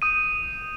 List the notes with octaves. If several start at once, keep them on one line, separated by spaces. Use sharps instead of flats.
D#6 G6 D#7